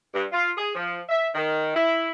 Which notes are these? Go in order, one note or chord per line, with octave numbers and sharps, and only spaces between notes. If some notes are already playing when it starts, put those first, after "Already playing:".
G2
F4
G#4
F3
E5
D#3
E4